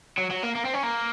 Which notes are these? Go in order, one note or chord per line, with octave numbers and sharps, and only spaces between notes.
F#3
F#3
A#3
A#3
C4
C#4
A#3